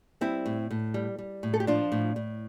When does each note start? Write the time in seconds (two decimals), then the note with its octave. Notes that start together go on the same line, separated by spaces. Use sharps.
0.21 G3 C4 E4
0.46 A2
0.71 A2
0.94 G3
1.18 G3
1.43 A2
1.54 A4
1.60 G4
1.67 F3 D4 F4
1.92 A2
2.16 A2